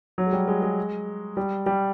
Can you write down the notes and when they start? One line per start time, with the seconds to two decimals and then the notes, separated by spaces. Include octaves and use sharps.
0.18 F#3
0.27 G#3
0.33 G3
0.48 G#3
0.62 G#3
1.37 G3
1.66 G3